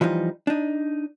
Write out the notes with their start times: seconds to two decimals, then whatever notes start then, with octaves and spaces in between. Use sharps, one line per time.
0.01 E3 F3 G3 D#4
0.47 D4 D#4